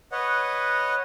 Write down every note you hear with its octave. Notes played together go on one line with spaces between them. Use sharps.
B4 C#5 D#5 F#5